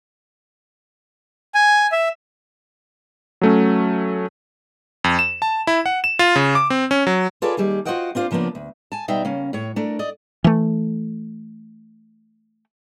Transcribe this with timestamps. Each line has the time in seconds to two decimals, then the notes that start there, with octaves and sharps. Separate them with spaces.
1.55 G#5
1.92 E5
3.41 F#3 A3 C#4
5.04 F2
5.19 E7
5.42 A5
5.67 E4
5.86 F#5
6.04 E7
6.19 F4
6.36 C#3
6.55 D6
6.70 C4
6.91 C#4
7.07 F#3
7.42 F4 G#4 A4 B4 C#5 D5
7.57 D#2 G3 G#4 G#5
7.85 F4 F#4 C5 D#5 F#5 G5
8.15 C4 D4 F4 C5
8.31 C#3 F3 A#3 B3 D4
8.55 D2
8.92 G#5 A5
9.08 B2 G3 D#4 E5 G5
9.25 C#3 A#3 C#4
9.53 A2 C#5
9.76 A3 D4 A#4
9.99 D5 D#5
10.44 E3 A3